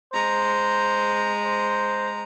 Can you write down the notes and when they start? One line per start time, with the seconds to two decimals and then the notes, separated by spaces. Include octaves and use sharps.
0.13 G#3 C5 A#5
1.45 C5